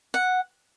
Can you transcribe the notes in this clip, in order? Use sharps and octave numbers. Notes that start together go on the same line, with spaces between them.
F#5